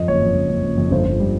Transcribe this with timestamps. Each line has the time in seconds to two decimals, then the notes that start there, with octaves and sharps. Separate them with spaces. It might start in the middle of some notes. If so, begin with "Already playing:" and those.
Already playing: F2 D#5
0.08 F#1 C#5
0.22 F2
0.35 F#1
0.50 F#1
0.63 F#1
0.78 F2
0.91 G1 C5
1.05 G1
1.20 G3